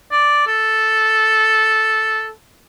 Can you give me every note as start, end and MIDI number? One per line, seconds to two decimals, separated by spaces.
0.12 0.43 74
0.47 2.30 69